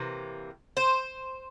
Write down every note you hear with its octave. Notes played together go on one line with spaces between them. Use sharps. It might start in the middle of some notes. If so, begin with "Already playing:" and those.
Already playing: C3 E3 A#3
C5